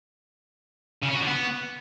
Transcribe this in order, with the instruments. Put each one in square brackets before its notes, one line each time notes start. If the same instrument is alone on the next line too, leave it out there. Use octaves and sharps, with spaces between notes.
[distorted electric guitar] C#3
C#4
F#4
D3
B3